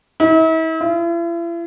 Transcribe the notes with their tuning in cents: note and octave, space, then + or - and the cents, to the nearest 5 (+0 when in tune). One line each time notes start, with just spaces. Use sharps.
E4 -40
E4 +45